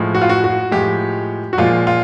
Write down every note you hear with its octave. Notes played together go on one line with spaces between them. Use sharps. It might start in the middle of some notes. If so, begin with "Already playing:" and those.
Already playing: A2 F3 G#3
F#4
F4
F#4
F#4
A2 F3 G#3 G4
F#4
A#2 F3 G#3 F4
F4